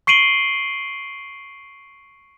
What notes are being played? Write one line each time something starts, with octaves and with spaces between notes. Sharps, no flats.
C#6 C7 D7 D#7 F#7 G7